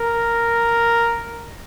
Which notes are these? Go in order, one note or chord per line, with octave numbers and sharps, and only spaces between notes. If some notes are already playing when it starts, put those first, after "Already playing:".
Already playing: A#4